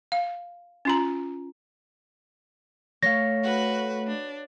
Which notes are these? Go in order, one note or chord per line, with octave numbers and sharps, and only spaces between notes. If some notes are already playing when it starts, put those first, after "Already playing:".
F5
C#4 F4 A#5
A3 C#5 F5 A#6
F#4 B4
D4